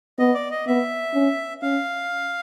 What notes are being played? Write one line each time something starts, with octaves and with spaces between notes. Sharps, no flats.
B3 D#5
D5
D#5
B3 E5
C#4
C#4 F5